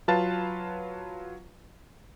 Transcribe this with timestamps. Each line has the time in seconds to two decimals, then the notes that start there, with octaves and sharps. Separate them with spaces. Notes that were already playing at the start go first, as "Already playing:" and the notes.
0.08 F#3 F4 B4 F5 A5 A6